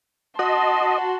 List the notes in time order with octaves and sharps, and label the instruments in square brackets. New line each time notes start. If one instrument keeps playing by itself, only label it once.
[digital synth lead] F#4 [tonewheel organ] D#5 [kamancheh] A5 C6